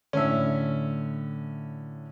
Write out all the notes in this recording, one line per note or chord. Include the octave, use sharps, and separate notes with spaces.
A2 D3 C#4 E5